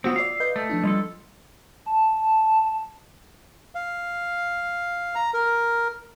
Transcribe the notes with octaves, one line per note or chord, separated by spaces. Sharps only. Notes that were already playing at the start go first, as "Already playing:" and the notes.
F#3 B3 C4 F4 F#4 C5
D5 F5 E6
B4 D#5 G6
A3
F3 D4 E4
G3 F4 A4 D#5
A5
F5
A#5
A#4